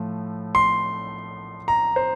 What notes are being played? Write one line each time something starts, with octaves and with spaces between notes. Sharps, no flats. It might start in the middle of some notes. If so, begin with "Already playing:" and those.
Already playing: A2 F3 A3
C6
A#5
C5